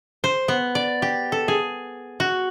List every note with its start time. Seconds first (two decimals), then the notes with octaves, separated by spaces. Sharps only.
0.24 C5
0.48 B3
0.75 D5
1.02 G4
1.32 A4
1.48 G#4
2.20 F#4